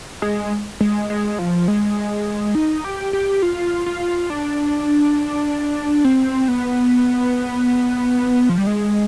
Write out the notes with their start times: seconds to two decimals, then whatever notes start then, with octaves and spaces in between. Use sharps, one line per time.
0.22 G#3
0.81 G#3
1.10 G#3
1.39 F3
1.68 G#3
2.55 D#4
2.84 G4
3.13 G4
3.42 F4
3.86 F4
4.30 D4
6.04 C4
6.48 B3
8.49 F3
8.58 G3
8.67 G#3